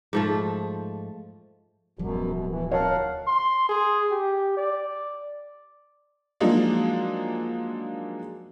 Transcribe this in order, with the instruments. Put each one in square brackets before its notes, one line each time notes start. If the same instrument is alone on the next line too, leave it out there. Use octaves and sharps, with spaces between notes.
[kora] G#2 F3 A3
[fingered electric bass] D1 F3 G3 [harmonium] F#2 B2
[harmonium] B2
B2 E3
[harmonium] A#4 F5 F#5 [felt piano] C#5 A5
[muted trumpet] C6
G#4
G4
D5
[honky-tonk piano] F3 F#3 G#3 A#3 D4 D#4